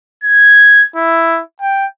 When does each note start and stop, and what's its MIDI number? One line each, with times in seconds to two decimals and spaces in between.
0.24 0.86 92
0.96 1.41 64
1.61 1.86 79